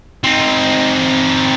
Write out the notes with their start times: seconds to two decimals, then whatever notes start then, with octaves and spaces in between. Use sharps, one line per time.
0.24 C4 D#4